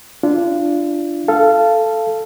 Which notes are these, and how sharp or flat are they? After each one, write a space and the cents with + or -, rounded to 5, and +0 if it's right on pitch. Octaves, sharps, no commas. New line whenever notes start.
D4 +0 F4 -30
A4 +0 F5 -20